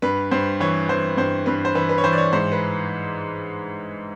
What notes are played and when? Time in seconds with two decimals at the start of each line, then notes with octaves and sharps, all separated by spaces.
0.02 G2 B4
0.31 G2 C5
0.60 E3 C#5
0.89 E3 C5
1.17 G2 C5
1.46 G2 B4
1.65 C5
1.75 E3 B4
1.89 B4
1.98 C#5
2.04 E3 C5
2.13 D5
2.18 C#5
2.33 G#2 C5
2.52 B4